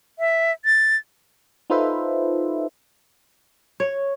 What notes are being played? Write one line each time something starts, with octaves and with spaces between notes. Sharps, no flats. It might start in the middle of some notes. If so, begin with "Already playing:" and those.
E5
A6
D#4 F4 A4 B4 C5 E5
C#5